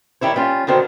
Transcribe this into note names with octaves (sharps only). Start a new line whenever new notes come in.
D#3 G3 E4 C#5
G3 C#4 F4
B2 D3 D#3 C4